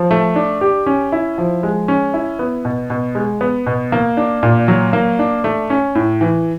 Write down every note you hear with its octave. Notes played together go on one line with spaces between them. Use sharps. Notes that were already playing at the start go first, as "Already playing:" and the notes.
Already playing: F3
A3
D4
G4
C#4
E4
F3
G#3
C#4
E4
B3
B2
B2
G#3
B3
B2
A#3
D4
A#2
F#3
A#3
D4
A3
C#4
A2
E3